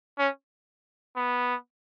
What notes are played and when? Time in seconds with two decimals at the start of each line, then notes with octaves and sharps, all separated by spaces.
0.19 C#4
1.16 B3